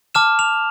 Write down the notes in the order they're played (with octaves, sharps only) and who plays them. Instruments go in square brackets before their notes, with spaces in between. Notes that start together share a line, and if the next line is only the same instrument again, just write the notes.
[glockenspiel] A5 D6 F6 E7
F7